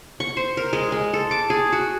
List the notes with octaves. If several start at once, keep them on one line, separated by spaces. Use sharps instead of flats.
C#6
C5
A#4
G#3
G#3
A4
D6
G#4
F#4